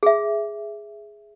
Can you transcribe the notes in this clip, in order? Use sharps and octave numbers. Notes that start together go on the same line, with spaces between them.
G#4 E5